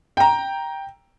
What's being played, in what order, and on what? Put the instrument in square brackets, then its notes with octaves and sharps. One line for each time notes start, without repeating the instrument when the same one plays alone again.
[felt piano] G5 A#5